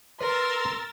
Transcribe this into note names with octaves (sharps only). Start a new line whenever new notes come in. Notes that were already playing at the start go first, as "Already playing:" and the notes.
A#4 B4 A#5 C6 E6 A6